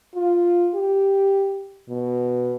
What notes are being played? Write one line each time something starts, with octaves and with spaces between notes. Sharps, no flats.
F4
G4
B2